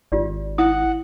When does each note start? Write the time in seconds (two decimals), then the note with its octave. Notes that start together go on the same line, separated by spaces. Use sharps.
0.12 G#1 F4 G4 D5
0.58 E4 F5 F#5 D#6